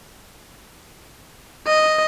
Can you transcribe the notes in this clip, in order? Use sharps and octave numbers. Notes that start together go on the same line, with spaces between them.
D#5